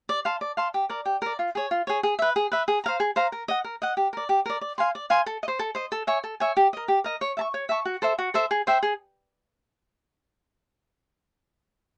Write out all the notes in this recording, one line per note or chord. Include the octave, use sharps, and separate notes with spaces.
D5
F5 A5 C6
D5
F5 A5 C6
G4
A#4 D5
G4
A#4 D5
F4
G#4 C#5
F4
G#4 C#5
G#4
B4 E5
G#4
B4 E5
G#4
C5 F5 A#5
G#4
C5 F5 A#5
A#4
D#5 F#5
A#4
D#5 F#5
G4
A#4 D5
G4
A#4 D5
D5
F5 G#5 C6
D5
F5 G#5 C6
A4
D#5
C5
A4
C5 D#5
A4
C#5 E5 G#5
A4
C#5 E5 G#5
G4
A#4 D#5
G4
A#4 D#5
C#5
E5 A5 C#6
C#5
E5 A5 C#6
F#4
A4 C5 E5
F#4
A4 C5 E5
G#4
C5 E5 G5
G#4